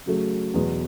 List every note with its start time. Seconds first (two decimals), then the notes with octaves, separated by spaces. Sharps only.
0.06 C#3 F#3 A3
0.54 E2 B2 F#3 B3